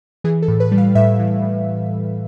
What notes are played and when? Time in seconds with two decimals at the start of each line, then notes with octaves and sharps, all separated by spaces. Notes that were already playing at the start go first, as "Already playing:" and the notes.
0.24 E3 G#4
0.42 A4
0.48 A2
0.60 B4
0.72 G3
0.78 F5
0.95 A2 E5
1.19 E3
1.42 A2